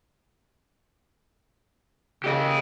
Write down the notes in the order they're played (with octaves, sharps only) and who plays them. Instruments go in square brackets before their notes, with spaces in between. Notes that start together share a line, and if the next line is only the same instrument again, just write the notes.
[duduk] C#3 [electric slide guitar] G4 D#5